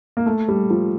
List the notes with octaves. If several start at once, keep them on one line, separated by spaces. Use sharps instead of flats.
A#3
A3
G3
F3